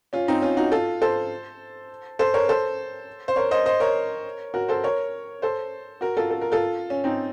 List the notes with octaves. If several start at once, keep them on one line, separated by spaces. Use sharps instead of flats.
C#4 F4
C4 D#4
C#4 F4
D#4 F#4
F4 A4
A4 C5
A4 C5
A#4 C#5
A4 C5
C5
A#4 C#5
C5 D#5
C5 D#5
A#4 C#5
F#4 A#4
A4 C5
A#4 C#5
A4 C5
F#4 A#4
F4 A4
A4
A#4
F4 A4
C#4
C4 D#4